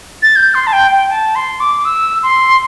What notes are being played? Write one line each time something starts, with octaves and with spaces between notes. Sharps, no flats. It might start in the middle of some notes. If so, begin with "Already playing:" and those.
A6
G6
C6
A5
G5
G5
A5
C6
D6
E6
C6